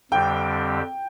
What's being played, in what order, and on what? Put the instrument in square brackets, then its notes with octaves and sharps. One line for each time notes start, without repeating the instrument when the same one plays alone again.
[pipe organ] F2 D3 G3 C4 G4 [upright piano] G5